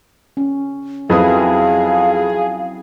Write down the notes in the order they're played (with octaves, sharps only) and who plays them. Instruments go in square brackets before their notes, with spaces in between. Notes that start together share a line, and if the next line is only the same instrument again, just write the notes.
[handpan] C#4
[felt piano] F2 B4 D#6 [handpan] F#3 C4 E4 [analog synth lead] G#4 [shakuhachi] F5